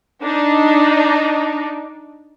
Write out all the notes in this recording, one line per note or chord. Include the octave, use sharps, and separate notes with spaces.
D4 D#4